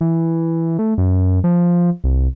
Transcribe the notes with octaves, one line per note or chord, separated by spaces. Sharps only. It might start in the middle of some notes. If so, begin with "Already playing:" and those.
E3
A3
F#2
F3
C2